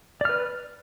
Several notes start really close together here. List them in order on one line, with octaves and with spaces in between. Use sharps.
D5 F6 B4